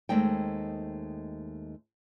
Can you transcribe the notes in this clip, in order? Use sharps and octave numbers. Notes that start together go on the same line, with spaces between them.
D#2 G#3 A3 C4 D#4 G5